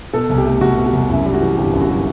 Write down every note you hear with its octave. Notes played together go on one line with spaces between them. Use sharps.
B2 A4
C2
G4
A3
C2 F#4
B2
F#4
C2
F#2 E4
G3
F#4
E3
G1 G4
F#2
F#4
G3